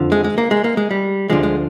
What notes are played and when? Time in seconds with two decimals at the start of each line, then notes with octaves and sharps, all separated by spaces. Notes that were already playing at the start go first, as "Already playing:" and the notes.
Already playing: F2 D3 F3
0.12 G#3
0.24 G#3
0.38 A#3
0.51 G#3
0.64 A#3
0.77 G#3
0.91 G3
1.30 D2 D3 F3 G#3
1.43 G#3